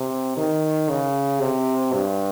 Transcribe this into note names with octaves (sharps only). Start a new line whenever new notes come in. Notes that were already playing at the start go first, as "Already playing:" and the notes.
Already playing: C3
D#3
C#3
C3
G2